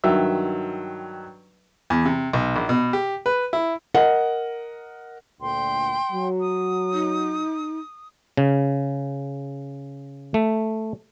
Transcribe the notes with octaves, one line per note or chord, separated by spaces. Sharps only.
G2 D#3 F#3 E5 E6
E2
C3
B1
A#1
B2
G4
B4
E4
A#4 D#5 F#5
D2 A#2 G5 C6
F#3
D#6
D#4
C#3
A3